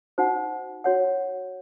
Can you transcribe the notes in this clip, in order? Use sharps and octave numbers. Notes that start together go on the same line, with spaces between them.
D#4 F#4 C5 F#5
F#4 C#5 F#5